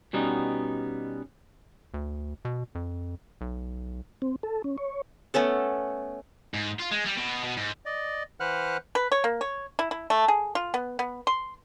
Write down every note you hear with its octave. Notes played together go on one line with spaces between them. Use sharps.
B2 G3 B3 C#4 D#4
D2
B2
F2
B1
C4
A4
C#4
C#5
A3 B3 C#4 A4
G#2
F4
G#3
G3
B2
B2
G#2
D5 D#5
E3 B4 C5 F#5 F6 F#6
B4
C#5
A#3
C#5
E4
E4
A3
G#4
F4
B3
B3
C6